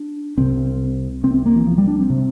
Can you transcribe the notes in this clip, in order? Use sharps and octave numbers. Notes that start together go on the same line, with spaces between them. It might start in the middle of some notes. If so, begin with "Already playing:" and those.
Already playing: D4
C2 C3 C4
C2 C3 C4
C4
A#3
E3
F3
G3
D4
C4
C3